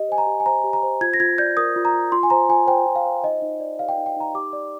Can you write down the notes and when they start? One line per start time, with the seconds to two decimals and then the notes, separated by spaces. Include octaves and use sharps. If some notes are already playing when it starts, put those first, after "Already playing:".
Already playing: G4 D#5
0.09 C5 G#5
0.18 A#5
0.27 G4
0.40 G#5
0.46 C5 A#5
0.64 G4
0.73 A#5
0.83 C5
1.01 F4 G#6
1.13 A#6
1.20 F4 G#6
1.38 D5 G6
1.57 A#4 D#6
1.76 F4
1.85 A#5
1.94 F4
2.12 F4 C6
2.23 G#5
2.30 C5 A#5
2.49 F4 G#5
2.67 C5 G5
2.86 F4
2.96 F5
3.05 C5
3.23 D#4 D#5
3.42 D#4
3.60 D5
3.79 G4 F5
3.89 G5
3.93 D#4 F5
4.06 G5
4.16 D#4 A#5
4.34 G4 D6
4.53 D5